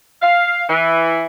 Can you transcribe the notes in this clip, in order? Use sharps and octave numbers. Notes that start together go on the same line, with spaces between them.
F5
E3